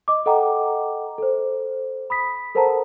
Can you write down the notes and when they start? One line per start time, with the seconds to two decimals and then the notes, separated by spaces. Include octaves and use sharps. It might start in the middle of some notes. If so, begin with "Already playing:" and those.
0.08 D#5 D6
0.26 A4 D#5 F#5 G5 A#5 D6
1.18 A4 C5
2.10 B5 D#6 B6
2.55 A4 A#4 C5 F#5 A5 A#5